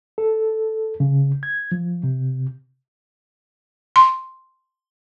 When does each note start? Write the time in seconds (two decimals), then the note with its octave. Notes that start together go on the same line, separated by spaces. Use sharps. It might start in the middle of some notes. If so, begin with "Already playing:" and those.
0.18 A4
1.00 C#3
1.43 G#6
1.72 F3
2.03 C3
3.96 C6